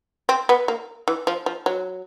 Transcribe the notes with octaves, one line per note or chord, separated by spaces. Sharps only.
C4
B3
A#3
E3
F3
F3
F#3